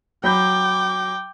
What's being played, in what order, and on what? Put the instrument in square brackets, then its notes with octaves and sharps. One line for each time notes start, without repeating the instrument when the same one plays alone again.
[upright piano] F#3 B5 G6 [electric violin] G5 D6